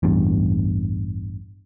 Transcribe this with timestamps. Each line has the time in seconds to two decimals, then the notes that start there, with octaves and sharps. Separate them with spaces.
0.03 A1 E2 G2